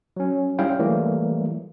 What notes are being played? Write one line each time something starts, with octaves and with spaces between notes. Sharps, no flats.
F#3 C#4
G3 C#4 E4 C#5 F5 G5
E3 F#3 G3 A3 A#3